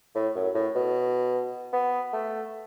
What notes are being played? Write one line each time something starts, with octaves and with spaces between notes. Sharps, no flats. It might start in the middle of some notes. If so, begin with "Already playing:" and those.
A2
F#2
A2
B2
B3
A3